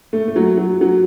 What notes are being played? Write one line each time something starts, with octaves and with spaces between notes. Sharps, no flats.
A3
A3
F#3
F#3
F#3